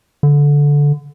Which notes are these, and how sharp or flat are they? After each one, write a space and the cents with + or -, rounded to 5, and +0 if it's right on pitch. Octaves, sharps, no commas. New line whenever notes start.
D3 -15